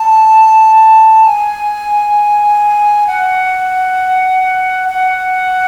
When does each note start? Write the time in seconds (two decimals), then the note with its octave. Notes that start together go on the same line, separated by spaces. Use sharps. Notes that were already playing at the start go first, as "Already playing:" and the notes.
Already playing: A5
1.25 G#5
3.07 F#5
4.89 F#5